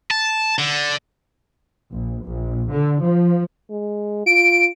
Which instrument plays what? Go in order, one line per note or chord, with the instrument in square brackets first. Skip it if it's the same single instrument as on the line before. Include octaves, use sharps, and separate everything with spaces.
[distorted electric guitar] A5
D3
[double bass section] A#1
A#1
D3
F3
[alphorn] G#3
[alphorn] F4 [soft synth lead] D7